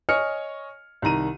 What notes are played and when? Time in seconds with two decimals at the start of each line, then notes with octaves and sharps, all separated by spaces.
0.09 C#5 D#5 G#5 F6 C#7
1.02 C2 D#3 A#5 D#7